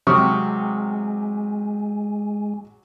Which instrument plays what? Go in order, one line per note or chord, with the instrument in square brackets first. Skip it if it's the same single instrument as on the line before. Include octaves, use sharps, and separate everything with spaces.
[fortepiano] C3 [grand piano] F#3 G4 [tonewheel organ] G#3 [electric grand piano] C#6 D#6 F6